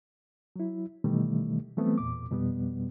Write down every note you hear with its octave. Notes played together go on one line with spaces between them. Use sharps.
F#3 E4
B2 D#3 E3 G3 A3
E3 F#3 G3 A3 B3 C4
E2 A#2 D6
F2 B2 G3 B3